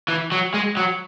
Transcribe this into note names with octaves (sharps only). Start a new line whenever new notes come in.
E3
F#3
G#3
F#3